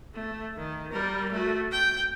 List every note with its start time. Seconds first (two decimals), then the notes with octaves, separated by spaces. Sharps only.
0.14 A3
0.57 D#3
0.92 G3 A#4
1.31 A3 F#4
1.71 G5